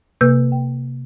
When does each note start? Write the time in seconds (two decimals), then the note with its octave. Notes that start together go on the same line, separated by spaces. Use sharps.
0.21 C3 A#3 B4 E6 G6
0.52 G5